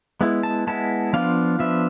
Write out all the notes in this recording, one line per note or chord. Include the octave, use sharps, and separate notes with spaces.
G#3 B3 E4
A5
G#3 B3 E4 A5
F3 B3 D4 F4 F5
F3 B3 D4 F4 E5